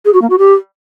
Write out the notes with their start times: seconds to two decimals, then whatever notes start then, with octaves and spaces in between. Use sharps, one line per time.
0.05 G#4
0.13 F#4
0.22 A#3
0.30 F#4
0.38 G4